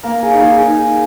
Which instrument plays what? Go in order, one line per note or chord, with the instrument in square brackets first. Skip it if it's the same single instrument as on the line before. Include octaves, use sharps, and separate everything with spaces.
[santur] A#3 A#4
G#4
D#4
G#4
D#4